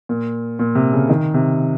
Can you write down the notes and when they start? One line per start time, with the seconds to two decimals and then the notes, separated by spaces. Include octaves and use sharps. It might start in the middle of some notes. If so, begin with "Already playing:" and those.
0.09 A#2
0.59 A#2
0.75 C3
0.93 C#3
1.09 D#3
1.34 C3